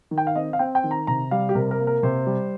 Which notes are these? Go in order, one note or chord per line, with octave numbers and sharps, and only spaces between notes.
D#3
G5
F5
C4 D#5
F5
C4 G5
G5
D#3
A#5
C3 A#5
G3 F5
G4
C3 A#4
A#4
A#3
A#4
C3 C5
G3